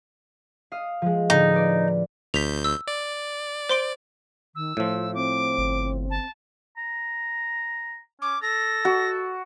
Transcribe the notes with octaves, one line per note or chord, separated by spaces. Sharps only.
F5 D#6
F3 G#3
A2 D3 D#4
B4 D5
D2 G6 B6 F7
E6
D5
C5 C6 D7
D#3 E6
A2 F3 F4
C4 D6
G1
A5
A#5
C#4 D6
A4 A#6
F#4